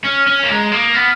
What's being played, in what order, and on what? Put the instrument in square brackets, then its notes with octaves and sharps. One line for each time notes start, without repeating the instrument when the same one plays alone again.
[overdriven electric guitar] C#4 [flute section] F6
[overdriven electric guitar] C#4
[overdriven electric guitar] A#3 [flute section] G#5
[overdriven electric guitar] G#3 [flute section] A#5
[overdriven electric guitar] A#3 [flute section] D#6
[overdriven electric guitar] B3 [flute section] F6